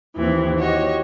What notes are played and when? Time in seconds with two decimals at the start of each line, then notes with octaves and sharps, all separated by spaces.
0.15 D#2 E3 C4
0.59 F#4 G4 C#5 D#5